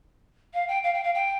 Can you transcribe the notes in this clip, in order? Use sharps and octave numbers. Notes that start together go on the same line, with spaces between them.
F5
G5
F5
G5
F5
G5